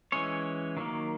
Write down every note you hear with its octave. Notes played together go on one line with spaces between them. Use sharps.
E3 G#3 C#4 C#5
D#3 F#3 A#3